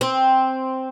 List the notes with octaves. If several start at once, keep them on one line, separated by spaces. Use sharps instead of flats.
C4